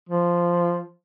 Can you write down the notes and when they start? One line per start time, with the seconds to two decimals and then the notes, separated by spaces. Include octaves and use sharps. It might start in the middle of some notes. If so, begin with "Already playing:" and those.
0.09 F3